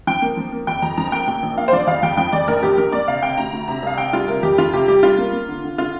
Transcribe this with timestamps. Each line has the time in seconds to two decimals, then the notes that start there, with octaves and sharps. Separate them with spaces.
0.07 F3 G5
0.22 A#3
0.37 F3
0.52 A#3
0.67 F2 G5
0.82 F2 A#5
0.98 F3 A#5
1.08 A#5
1.12 A#3 G5
1.27 A#2 G5
1.43 A#1
1.57 A#3 F5
1.68 C5
1.73 F3 D5
1.87 F2 F5
2.03 F2 G5
2.18 F3 G5
2.33 F2 D5
2.48 A#1 A#4
2.63 A#1 G4
2.77 A#1 A#4
2.92 A#3 D5
3.08 C3 F5
3.23 C3 G5
3.38 D2 A#5
3.53 D2
3.68 C3 A#5
3.83 C2 F5
3.98 C3 G5
4.13 G3 F4
4.28 C3 A#4
4.43 F2 G4
4.58 F2 F4
4.73 C3 G4
4.88 G3 G4
5.03 G3 F4
5.18 A#3
5.33 A#3
5.48 D3
5.64 D3
5.78 D3 F4